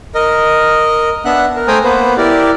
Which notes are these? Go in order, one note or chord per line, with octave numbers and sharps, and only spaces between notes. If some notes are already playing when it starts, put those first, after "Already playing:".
A#4 D#5
B3 D4 E5 F#5 F#6
A#4
A3 C5 G5 G#5 A#5 D#6
A#3 B3 B4 C5
E4 G4 A#4 D5